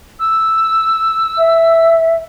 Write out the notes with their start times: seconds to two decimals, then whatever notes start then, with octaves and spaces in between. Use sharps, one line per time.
0.19 E6
1.37 E5